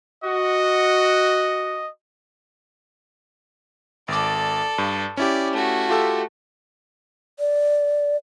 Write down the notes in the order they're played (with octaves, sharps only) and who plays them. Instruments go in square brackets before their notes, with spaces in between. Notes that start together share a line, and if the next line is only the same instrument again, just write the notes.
[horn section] F#4 [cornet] D#5
[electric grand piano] G#1 D6 [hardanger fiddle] A4 D5
[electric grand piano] G2
[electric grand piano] C#4 E4 G4 [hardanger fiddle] D5
[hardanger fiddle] A3 F#4
[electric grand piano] F4 G4 A4
[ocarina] D5